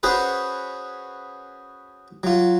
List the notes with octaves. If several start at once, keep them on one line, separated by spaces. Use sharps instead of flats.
C#4 F#4 G#4 B4 C5
F#3 F4